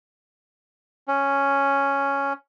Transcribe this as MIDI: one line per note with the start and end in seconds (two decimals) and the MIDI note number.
1.08 2.33 61